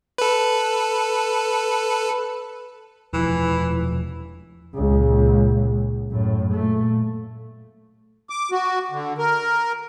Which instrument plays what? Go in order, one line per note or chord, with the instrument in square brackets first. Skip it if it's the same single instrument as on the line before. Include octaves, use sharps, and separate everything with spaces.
[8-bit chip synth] A4 B4
[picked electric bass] E1 F3 [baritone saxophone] E3
[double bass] C#2 A#2
F#2 A2
A#2 A3
[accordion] D6
F#4
D3
A#4